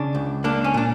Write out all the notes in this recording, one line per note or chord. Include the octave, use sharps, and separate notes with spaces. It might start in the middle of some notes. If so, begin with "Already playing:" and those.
Already playing: C#3 D4
C#2
A#3 D4
C#4
A#2 D4